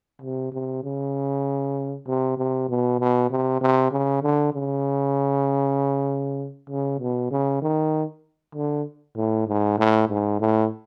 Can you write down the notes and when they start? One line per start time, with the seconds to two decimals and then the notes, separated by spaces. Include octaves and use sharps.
0.22 C3
0.52 C3
0.84 C#3
2.07 C3
2.38 C3
2.69 B2
2.99 B2
3.30 C3
3.61 C3
3.92 C#3
4.23 D3
4.54 C#3
6.70 C#3
7.00 B2
7.31 C#3
7.62 D#3
8.55 D3
9.16 A2
9.47 G#2
9.78 A2
10.09 G#2
10.40 A2